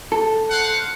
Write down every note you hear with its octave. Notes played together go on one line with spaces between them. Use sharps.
A4
C5 F5 F#5